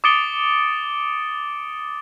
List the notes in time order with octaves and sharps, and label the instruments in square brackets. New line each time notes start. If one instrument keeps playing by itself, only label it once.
[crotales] D6 D#6 A6 C#7 D7 G7